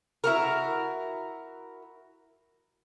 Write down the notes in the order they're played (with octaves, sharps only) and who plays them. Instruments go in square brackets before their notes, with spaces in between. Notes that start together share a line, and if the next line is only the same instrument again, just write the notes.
[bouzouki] E4 F#4 A#4